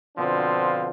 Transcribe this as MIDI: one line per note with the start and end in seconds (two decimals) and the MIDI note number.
0.17 0.89 47
0.17 0.89 50
0.17 0.89 53
0.17 0.89 60
0.17 0.89 62
0.17 0.89 65